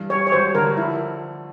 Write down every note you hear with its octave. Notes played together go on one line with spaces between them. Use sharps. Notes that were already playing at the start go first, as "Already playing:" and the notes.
Already playing: G2 E3
G3 C#5
C#5
G#1 C5
D3 A#4
F3 E4